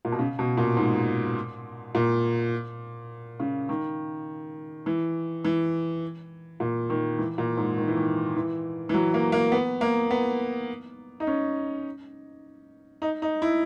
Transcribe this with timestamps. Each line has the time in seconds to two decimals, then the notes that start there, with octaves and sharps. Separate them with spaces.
0.05 A#2
0.12 B2
0.19 C#3
0.39 B2
0.57 A#2
0.77 G#2
1.95 A#2
3.40 C#3
3.69 D#3
4.86 E3
5.45 E3
6.60 A#2
6.90 D#3
7.19 E3
7.38 A#2
7.57 G#2
7.78 D#3
7.88 E3
7.97 D#3
8.36 E3
8.89 E3
8.94 F#3
9.14 A#3
9.32 A#3
9.52 B3
9.81 A#3
10.11 B3
11.20 D#4
11.27 C#4
13.02 D#4
13.22 D#4
13.42 E4